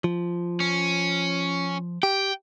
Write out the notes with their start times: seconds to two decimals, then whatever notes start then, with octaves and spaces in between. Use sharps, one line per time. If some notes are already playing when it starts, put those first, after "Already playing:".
0.04 F3
0.60 C#4
2.03 G4 G5